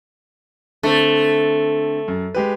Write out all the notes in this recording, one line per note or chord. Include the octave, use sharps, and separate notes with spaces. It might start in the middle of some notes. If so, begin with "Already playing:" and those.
D3 A3 C4
F#2
G#3 G4 B4